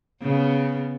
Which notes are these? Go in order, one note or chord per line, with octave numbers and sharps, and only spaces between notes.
C#3 B3